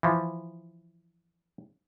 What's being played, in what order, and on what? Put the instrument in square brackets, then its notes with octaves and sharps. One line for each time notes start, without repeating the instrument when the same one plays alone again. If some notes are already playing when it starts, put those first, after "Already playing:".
[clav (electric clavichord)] E3 F3